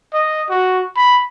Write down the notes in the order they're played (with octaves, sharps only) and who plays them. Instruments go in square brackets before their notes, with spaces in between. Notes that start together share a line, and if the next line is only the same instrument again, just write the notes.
[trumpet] D#5
F#4
B5